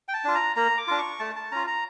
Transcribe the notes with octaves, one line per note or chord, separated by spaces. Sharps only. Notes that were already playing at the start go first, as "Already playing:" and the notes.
G5
A5
D4 F4
A#5
A#3 A#5
D6
D4 F4
C#6
A3 A5
A5
C#4 F4 A#5
A#5